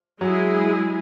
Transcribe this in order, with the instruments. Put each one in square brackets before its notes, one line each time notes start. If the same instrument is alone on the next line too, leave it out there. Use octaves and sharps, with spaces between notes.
[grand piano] F#3 [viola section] G#3 E4 G#4